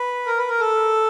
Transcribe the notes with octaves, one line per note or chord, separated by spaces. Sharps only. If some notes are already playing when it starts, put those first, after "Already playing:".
Already playing: B4
A#4
B4
A#4
A4